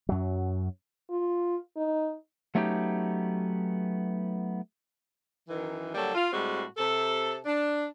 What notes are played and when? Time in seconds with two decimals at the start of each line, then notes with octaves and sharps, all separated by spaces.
0.09 F#2 F#3
1.10 F4
1.77 D#4
2.55 F#3 A3 B3 C#4 D#4 G4
5.49 F#2 D#3 E3
5.95 D3 F#3 G3 A#3 A4
6.14 F4
6.33 A2 G3 G#3 C4 F#4
6.77 C3 A4
7.45 D4